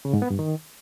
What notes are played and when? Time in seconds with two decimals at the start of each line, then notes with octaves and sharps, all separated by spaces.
0.05 C#3
0.13 G#2
0.22 B3
0.30 G2
0.39 D#3